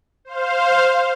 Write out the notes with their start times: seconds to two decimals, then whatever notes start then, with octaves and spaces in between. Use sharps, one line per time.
0.25 C5 F5